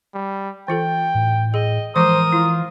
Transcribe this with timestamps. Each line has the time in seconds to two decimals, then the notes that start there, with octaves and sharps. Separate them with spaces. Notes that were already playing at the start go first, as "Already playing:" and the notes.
0.14 G3
0.68 E3 F4 A4 G5
1.15 A2
1.54 G#4 D#5
1.96 E3 F3 G#3 A#4 C5 C#6 D#6
2.32 E4 F4